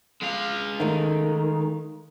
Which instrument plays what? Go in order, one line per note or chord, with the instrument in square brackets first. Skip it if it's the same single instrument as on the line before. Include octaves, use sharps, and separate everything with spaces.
[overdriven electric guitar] G#3 F5
[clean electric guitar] D#3 [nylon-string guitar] A3 D#4